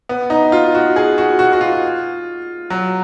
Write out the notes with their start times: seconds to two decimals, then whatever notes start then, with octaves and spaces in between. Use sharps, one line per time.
0.09 B3
0.30 D#4
0.52 F4
0.75 F#4
0.96 G#4
1.18 F#4
1.39 F#4
1.53 F#4
1.61 F4
2.70 F#3